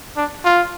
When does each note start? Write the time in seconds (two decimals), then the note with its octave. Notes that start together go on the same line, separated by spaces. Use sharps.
0.17 D4
0.45 F4